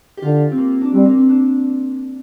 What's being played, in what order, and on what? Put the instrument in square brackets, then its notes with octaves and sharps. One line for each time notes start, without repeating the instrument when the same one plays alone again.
[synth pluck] G4
[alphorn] D3 [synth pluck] F4
[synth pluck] C4
A#3
A#3
D4
[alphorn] G3 [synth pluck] C4
[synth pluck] A#3
C4
D4